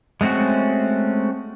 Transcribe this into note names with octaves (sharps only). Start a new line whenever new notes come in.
G#3 A3 C4 C#4 F#4